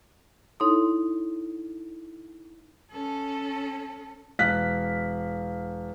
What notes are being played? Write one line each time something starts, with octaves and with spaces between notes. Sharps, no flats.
D#4 E4 A4 C#5 C6 D#6
C#4 A4
E1 F5 F#6 B6